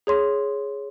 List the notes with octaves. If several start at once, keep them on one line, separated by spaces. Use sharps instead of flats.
G#4 C#5 C6